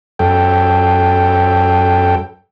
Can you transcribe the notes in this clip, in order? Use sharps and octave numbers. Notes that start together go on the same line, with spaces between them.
F#2 A4 G5